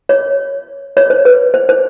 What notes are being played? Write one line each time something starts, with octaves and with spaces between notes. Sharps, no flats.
C#5
C#5
C5
B4
C5
C5